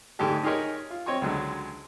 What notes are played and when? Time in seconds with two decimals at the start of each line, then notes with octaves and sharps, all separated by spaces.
0.19 D2 G#2 G#3 G4 A4
0.43 D#4 G4 G#4 A#4 C#5 D#5
0.91 F4
1.06 C4 C#5 D#5 G5 C#6
1.22 C#2 D3 F#3 G#3